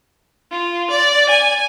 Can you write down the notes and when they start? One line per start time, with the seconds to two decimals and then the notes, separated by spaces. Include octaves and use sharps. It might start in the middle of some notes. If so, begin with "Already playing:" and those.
0.52 F4
0.91 D5
1.30 G#5